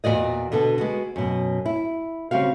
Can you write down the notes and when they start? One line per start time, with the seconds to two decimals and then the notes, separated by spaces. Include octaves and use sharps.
0.04 E2 A#2 E3 F#4 D5 D#5
0.52 B2 D3 B3 A4
0.78 G#3 B3 F#4
1.16 F#2 B2
1.66 E4
2.31 C#3 G3 C4 F#4 F5